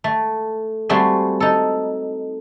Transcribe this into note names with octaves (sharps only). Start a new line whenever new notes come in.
A3
G3 A3 C4 F#4 G#4
D#4 A4